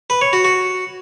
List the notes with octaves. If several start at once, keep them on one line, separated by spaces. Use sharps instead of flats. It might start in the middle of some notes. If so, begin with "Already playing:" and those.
B4
C#5
F#4
F#4